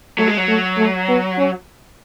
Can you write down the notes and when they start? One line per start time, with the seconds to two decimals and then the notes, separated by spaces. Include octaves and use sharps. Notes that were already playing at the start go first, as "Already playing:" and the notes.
0.18 F#3 A3
0.28 G#3
0.37 F#3
0.48 A3
0.78 A3
1.08 B3
1.38 C#4